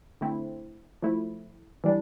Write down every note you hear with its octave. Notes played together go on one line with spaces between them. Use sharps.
D3 A3 C4 E4
F3 A3 E4
E3 G3 D4